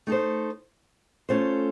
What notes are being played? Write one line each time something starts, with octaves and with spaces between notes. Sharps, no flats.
A3 D#4 A4 C5
A3 C#4 F4 A4 C5